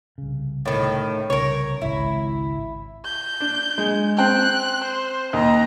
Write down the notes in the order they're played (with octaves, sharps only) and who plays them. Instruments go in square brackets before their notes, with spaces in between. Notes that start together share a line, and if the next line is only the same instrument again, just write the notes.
[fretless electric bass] C2 C#3
[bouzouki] A2 D#3
[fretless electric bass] C2 C#3 [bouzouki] A#4 C#5
[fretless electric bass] G#1 C#2 [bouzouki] E4
[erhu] G6
[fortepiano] D4
G#3
[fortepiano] C4 G5 [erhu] F#6
[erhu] C5
[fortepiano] D#2 [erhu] A#5